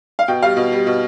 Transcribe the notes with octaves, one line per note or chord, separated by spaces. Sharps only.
F5
B2 G5
G3 F5
B2
G3
B2